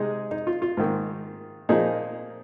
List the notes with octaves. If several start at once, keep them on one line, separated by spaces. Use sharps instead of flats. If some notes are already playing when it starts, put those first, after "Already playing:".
Already playing: C3 G#3 D#4 G#4
D#4
F4
F4
G#2 D#3 A#3
A#2 F3 A#3 D#4 G#4